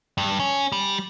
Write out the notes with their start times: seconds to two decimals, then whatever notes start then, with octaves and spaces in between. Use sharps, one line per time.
0.18 G2
0.40 C#4
0.72 G3